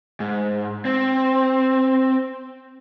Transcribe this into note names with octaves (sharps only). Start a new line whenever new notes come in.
G#2
C4